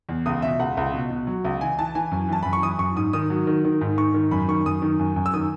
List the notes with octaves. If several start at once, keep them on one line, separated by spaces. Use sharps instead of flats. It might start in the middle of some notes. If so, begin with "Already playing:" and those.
E2
C#2 D#6
B2 E5
C#2 F#5
C#2
B2
B2
F#3
C#2
E3 G#5
E3 A5
E3 G#5
F#2
E3 A5
F#2 B5
C#6
E3 D#6
F#2 C#6
G#2 D#6
D#3 D#6
F#3
D#3
D#3
G#2
G#2 C#6
D#3
F#2 B5
D#3 C#6
F#2 D#6
D#3
F#2
F#2
E6
D#3 D#6